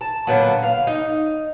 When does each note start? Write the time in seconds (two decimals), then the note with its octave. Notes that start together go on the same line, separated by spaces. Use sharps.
0.01 A5
0.27 A#2 D3 F#3 B3
0.63 F5
0.87 D#4